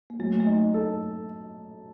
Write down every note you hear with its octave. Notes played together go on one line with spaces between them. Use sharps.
A#3
F#3 A3
A3
D#4
A4